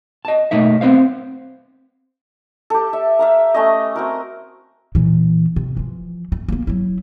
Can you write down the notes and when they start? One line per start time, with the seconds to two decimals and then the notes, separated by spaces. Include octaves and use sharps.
0.25 D#5 A5
0.51 B2 A3 A#3 D#4 E5
0.81 B3 C4 C5 F5
2.70 G4 A4
2.93 E5
3.19 E5 F5 A#5
3.54 A3 C#4 D#5
3.96 C4 F#4 A#4
4.95 A#2 E3
5.56 C3
5.77 E3 F3
6.32 A3
6.48 A#3 B3
6.67 F#3 E4